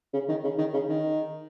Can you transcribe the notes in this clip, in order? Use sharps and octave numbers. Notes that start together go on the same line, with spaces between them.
C#3
D#3
C#3
D#3
C#3
D#3